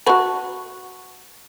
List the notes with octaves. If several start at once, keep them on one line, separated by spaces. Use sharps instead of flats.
F#4 B4 F#5 A5 C#6